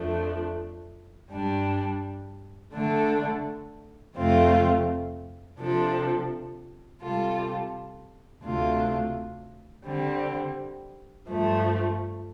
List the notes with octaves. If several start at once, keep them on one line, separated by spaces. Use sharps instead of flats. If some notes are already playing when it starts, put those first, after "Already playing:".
Already playing: F2 F3 A3 D4
G2 G3 D4
D3 A3 D4 A4
F2 C3 A3 C4 F4
C3 F3 D4 A4
C3 G3 F4 A4
D2 C3 A3 D4 F4
D3 G3 C4
G2 F3 A3